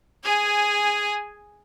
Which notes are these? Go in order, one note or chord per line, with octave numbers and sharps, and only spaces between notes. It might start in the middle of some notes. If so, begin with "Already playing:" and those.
G#4 G#5